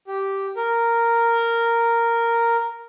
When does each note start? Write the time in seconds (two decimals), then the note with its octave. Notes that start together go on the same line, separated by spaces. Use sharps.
0.08 G4
0.56 A#4